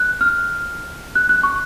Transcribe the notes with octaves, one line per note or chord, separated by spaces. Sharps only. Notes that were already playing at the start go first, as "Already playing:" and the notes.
Already playing: F#6
F6
F#6
F#6
C#6